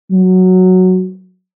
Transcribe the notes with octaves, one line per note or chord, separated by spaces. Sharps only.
F#3